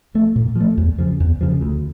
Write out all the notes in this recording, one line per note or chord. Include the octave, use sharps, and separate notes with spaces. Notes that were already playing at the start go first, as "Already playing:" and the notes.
F3 A3
A#2
F3 A3
E2
C#3 F3
E2
C#3 F3
D2